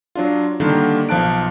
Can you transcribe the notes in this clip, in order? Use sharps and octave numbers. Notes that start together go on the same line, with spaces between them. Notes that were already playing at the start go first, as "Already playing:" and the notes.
F#3 D4 F4
D3 D#3 G3 A#3
B1 F3 F4 A5 F#6 D7